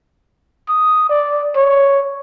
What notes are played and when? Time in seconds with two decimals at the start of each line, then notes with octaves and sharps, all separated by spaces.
0.69 D#6
1.10 D5
1.56 C#5